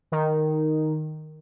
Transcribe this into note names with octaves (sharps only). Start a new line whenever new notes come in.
D#3